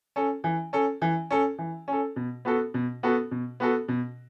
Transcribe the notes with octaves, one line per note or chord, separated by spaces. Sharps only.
C#4 A4
E3
C#4 A4
E3
C#4 A4
E3
C#4 A4
B2
B3 F#4 A4
B2
B3 F#4 A4
B2
B3 F#4 A4
B2